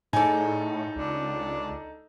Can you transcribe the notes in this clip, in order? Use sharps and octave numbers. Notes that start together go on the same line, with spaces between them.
A2 D#4 G#4 A4 D5
C#2 D4